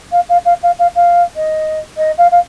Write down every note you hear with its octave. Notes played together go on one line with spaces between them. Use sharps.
F5
F5
F5
F5
F5
F5
D#5
D#5
F5
F5